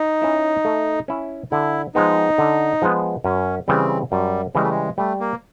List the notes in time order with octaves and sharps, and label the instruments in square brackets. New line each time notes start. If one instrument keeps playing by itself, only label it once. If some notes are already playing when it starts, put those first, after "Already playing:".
Already playing: [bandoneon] D#4
[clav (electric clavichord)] C#4 E4
A3
C#4 E4
[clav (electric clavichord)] D3 [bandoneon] E4
[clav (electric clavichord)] F3 G#3 B3 [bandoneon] D#4
[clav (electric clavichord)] D3
F3 G#3 B3
[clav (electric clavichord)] F#2 [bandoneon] C#4
[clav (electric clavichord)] C#3 E3 G3 [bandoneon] C4
[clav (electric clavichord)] F#2 [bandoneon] G3
[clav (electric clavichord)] C#3 E3 G3 [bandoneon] G#3
[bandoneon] A3
G#3
[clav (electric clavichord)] G3 [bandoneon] A3
[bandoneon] A#3